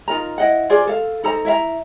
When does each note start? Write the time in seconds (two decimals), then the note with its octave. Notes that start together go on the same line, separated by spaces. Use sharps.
0.08 D#4 F4 A#4 A#5
0.38 E4 D#5 F#5
0.70 F4 G#4 C5 D5
0.87 A4 F5
1.24 D#4 A4 C5 A#5
1.45 E4 E5 F5 A#5